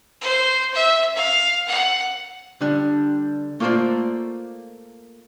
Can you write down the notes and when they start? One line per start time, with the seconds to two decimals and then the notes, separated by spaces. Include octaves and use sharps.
0.21 C5
0.74 E5
1.15 F5
1.67 F#5
2.61 D3 G3 D4
3.60 A3 A#3 F4 B4 C5 D5